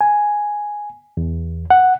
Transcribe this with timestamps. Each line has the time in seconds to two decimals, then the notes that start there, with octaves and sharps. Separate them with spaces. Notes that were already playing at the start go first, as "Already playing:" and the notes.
0.01 G#5
1.17 E2
1.70 F#5